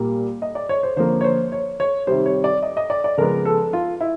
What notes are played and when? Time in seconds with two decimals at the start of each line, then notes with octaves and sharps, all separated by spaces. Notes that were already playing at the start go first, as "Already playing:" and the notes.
Already playing: A#2 G3 A#3
0.42 D#5
0.55 D5
0.69 C#5
0.83 C5
0.96 D3 F3 A#3 C5
1.21 C#5
1.24 C5
1.52 C#5
1.80 C#5
2.07 C3 D#3 G3 C5
2.26 C#5
2.44 D5
2.62 D#5
2.77 D#5
2.90 D5
3.04 D5
3.17 C#3 F3 G#3 B3 A#4
3.45 A4
3.73 F4
4.01 E4